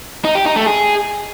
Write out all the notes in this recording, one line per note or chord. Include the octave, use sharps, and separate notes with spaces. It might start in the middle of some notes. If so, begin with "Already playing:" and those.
D#4
G4
D#4
A3
G#4